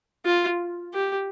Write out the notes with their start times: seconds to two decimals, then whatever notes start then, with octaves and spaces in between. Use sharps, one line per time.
0.25 F4
0.94 G4